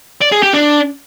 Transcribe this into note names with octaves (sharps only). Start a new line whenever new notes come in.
D5
G#4
G4
D4